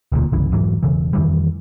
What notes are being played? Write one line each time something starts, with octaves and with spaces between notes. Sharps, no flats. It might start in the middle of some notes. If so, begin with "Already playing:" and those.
E1 D2 A#2
G1 C2 C#3 E3
F1 G#2 E3 F#3
E1 C#3 E3
F2 D#3 E3 G3